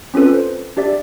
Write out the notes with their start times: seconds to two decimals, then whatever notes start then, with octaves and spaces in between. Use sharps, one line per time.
0.14 C4 C#4 F4 A4 B4
0.33 C5
0.77 D4 G4 D5 E5